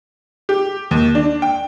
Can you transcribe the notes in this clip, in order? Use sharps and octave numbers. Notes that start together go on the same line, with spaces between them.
G4
D#2
D4
G5